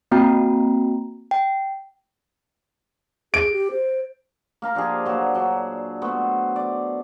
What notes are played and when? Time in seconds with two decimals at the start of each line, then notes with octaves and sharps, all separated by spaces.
0.11 A#3 C4 F#4 G5 A#5
1.31 G5
3.34 G#4 D7
3.52 G4
3.71 C5
4.62 A#3 F5 A#5
4.75 F3 D4 G4 G#4
5.06 A#2 F#3
5.35 F#3 D4
6.02 A3 B3 C5
6.56 D5